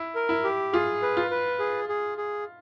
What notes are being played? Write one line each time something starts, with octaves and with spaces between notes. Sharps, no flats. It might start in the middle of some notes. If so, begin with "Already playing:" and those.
Already playing: E4
A#4
E4
G4
F4 G#4
B4
F4
B4
G#4
G#4
G#4